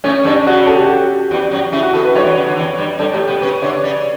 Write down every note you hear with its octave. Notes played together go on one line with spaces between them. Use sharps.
A2 A3 C#4
G2 G3 D4
C#3 F#4
A4
G4
F#4
G4
E2 E3
F#2 F#3
C#3 C#4 E4
F#4
B2 B3 A4
B4
G2 G3 C#5
E2 E3
C#3
D3
E2 E3
G2 G3
G2 G3 A4
A2 A3 G4
B2 B3 G4
C#3 C#4 B4
D3 D4 C#5
C#3 C#4 D5